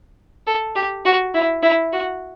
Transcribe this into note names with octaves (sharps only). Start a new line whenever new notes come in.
A4
G4
F#4
E4
E4
F#4